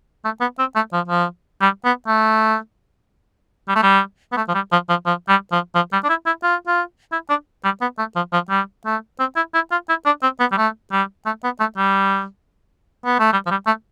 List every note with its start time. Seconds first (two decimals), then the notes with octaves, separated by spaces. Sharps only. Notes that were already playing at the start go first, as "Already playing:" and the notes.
0.25 A3
0.41 B3
0.59 C4
0.76 A3
0.93 F3
1.08 F3
1.61 G3
1.85 B3
2.08 A3
3.69 G3
3.76 A3
3.83 G3
4.32 B3
4.37 A3
4.49 F3
4.55 G3
4.72 F3
4.89 F3
5.06 F3
5.29 G3
5.52 F3
5.75 F3
5.93 G3
6.04 D4
6.09 E4
6.26 E4
6.43 F4
6.67 F4
7.12 E4
7.30 D4
7.64 G3
7.81 B3
7.99 A3
8.16 F3
8.33 F3
8.50 G3
8.86 A3
9.20 C4
9.36 E4
9.54 E4
9.72 F4
9.89 E4
10.06 D4
10.23 C4
10.40 B3
10.52 G3
10.57 A3
10.92 G3
11.26 A3
11.44 B3
11.60 A3
11.78 G3
13.05 B3
13.19 A3
13.33 G3
13.46 F3
13.51 G3
13.67 A3